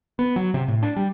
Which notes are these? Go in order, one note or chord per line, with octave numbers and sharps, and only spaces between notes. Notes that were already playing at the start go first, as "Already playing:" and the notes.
B3
F#3
C3
A2
D4
G3